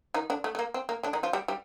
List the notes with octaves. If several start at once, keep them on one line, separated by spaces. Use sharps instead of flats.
D#3 D#4
D3 D4
A3
A3
A#3
C4
A#3
D3 D4
D#3 D#4
F3 F4
G3 G4
G3 G4